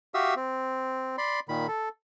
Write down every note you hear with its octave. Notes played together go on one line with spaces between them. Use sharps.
F#4 G4 E5 F5 D#6 E6
C4
D5 B5 C6
A#2 D#3 B5
A4